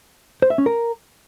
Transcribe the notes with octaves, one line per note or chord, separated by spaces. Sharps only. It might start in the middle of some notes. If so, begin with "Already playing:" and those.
C5
E5
C#4
A#4